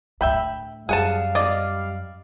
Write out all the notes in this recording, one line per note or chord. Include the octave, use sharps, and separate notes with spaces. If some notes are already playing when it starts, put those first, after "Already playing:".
D2 A2 E5 G5 B5
F#2 G3 G#4 F5 F#5 A5
D5 D#5